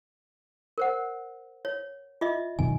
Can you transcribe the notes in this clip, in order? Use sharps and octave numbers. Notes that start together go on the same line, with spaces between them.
A#4 C5 F#5
C#5
F4 D#5 E5
F#2 B2 D#3 G#5